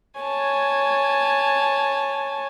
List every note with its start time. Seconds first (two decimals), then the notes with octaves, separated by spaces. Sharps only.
0.20 C#5 G#5 A5